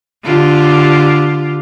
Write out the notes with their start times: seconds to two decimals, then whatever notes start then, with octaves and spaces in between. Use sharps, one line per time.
0.24 D3 F4 G4